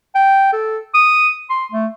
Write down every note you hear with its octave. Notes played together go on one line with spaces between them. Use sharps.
G5
A4
D#6
C6
A3